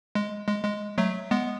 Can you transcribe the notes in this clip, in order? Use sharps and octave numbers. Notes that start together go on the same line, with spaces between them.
G#3
G#3
G#3
F#3 A3
G#3 B3